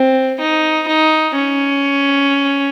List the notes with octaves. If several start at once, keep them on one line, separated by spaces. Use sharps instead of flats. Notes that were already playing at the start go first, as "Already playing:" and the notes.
Already playing: C4
D#4
D#4
C#4